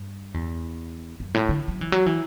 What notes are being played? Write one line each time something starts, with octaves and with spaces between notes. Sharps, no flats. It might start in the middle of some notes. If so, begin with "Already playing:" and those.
Already playing: G2
E2
F#2
A2
D3
F#3
E3
F#3
E3